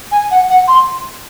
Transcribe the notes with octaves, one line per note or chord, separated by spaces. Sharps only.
G#5
F#5
F#5
C6